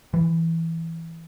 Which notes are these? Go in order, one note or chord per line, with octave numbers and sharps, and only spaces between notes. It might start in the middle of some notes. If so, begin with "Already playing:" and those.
E3